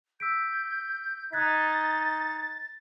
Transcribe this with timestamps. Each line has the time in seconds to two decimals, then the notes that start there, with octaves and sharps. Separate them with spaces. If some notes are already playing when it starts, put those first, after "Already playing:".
0.20 E6 G6 B6 D7
1.32 D#4 F#6 G#6 A6 B6